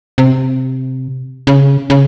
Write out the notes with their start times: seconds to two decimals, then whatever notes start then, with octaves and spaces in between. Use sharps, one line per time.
0.18 C3
1.47 C#3
1.90 C#3